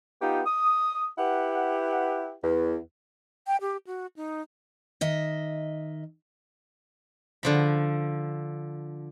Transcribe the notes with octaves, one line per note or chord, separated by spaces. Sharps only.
B3 D#4 F4 G4
D#6
E4 G4 B4 F#5
E2
G5
G4
F#4
D#4
D#3 D#5 E5
D3 F3 B5